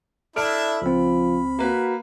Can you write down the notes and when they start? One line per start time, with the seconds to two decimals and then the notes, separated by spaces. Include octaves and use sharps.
0.36 D4 E4 A4 E5 E6 F6 D7
0.82 C#2 F3 C4 B5
1.59 A#3 F#4 B4